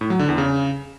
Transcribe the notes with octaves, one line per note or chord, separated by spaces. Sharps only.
A2
F#3
D3
E2
C#3